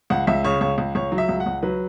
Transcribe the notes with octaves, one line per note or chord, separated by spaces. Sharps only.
C#2 F#5
C#2 E5
C#3 C#5
C#2 C#5
C#2
C#2 C#5
F#3
E5
C#2
F#5
C#2
F#3 B4